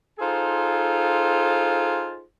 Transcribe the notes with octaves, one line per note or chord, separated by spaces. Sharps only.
D#4 F4 G#4 A4 C5